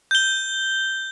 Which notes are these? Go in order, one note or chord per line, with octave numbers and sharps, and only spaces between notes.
G6 G7